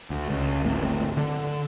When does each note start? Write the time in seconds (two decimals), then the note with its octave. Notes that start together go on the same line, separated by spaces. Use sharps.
0.10 D2
0.29 C#2
0.63 G1 D2 A2 C4
1.17 D3